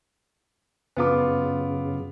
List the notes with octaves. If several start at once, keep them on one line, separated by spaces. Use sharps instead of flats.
F#2 C#3 B3 F4 D6